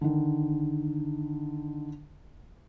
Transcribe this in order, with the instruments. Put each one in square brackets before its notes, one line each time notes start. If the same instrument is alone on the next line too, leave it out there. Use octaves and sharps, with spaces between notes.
[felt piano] D3 D#3